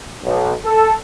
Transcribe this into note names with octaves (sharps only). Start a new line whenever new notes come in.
B1
A4